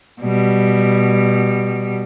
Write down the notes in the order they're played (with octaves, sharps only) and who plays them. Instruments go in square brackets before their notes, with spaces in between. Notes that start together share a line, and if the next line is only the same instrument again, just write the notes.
[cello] B2 G3